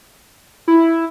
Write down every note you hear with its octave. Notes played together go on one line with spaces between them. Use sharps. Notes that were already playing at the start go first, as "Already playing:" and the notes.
E4